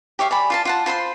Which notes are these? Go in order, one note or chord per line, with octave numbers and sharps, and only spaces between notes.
G4 C#5 E5 F5
D5 G#5 B5
F4 F5 A5
F4 F#5 A5
F4 C5 B5 C6